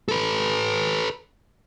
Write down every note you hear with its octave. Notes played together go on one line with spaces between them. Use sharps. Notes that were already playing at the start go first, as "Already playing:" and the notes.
A4 B4